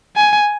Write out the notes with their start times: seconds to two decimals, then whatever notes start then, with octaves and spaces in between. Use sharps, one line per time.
0.16 G#5